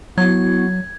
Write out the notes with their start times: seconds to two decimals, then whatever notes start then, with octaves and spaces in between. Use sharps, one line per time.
0.18 F#3 B3 E4 F#4 G#6